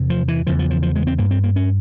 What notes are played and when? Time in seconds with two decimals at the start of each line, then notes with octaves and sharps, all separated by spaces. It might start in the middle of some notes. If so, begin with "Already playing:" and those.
Already playing: E2 C3
0.10 F3
0.28 E3
0.47 E2 C#3 F3
0.59 F3
0.70 F3
0.82 F3
0.95 G#3
1.07 C4
1.18 G2 A#3
1.31 C4
1.44 A#3
1.56 C#4